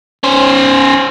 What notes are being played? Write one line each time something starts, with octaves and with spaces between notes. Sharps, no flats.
C#4 C5